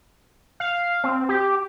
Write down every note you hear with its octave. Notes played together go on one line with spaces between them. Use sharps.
F5
C4
G4